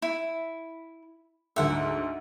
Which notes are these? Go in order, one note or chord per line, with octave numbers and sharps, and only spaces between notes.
E4
D2 G#2 E5 F#5